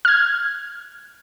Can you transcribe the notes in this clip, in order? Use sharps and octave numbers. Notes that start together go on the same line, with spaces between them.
F6 G#6